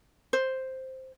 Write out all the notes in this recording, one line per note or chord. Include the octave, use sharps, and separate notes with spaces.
C5